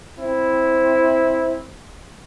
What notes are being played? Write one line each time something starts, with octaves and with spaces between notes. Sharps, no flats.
C4 E4